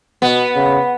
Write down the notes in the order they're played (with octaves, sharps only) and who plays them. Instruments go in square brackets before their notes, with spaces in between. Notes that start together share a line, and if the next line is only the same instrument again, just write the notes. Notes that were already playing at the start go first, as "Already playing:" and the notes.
[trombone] B2 [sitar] B3
[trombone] C#3